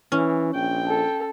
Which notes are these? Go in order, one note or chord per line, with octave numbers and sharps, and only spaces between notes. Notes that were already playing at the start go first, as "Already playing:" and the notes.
E3 C#4
A#1 G5
A4